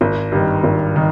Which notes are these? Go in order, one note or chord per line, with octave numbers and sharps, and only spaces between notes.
G#1
G2 D#3
G#1
D#3